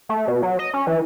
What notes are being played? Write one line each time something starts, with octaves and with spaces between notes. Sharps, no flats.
A3
B2
F#3
D#5
C#4
E3